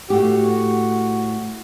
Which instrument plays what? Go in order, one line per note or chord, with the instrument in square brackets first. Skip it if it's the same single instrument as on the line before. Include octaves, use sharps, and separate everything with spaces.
[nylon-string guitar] A2 A3 G4 [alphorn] F#4